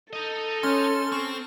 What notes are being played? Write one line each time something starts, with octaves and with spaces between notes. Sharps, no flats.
D#4 A4 D#5
C#4 C6 F6
C4 C#6